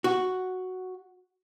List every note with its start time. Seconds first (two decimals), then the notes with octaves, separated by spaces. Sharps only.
0.04 F#4